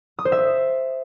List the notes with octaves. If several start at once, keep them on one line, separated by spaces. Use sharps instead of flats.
D#6
C5
E5